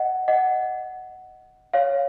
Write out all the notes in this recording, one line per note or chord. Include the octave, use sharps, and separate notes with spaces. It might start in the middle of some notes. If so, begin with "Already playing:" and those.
Already playing: D#5 F#5
D#5 F#5
C#5 F5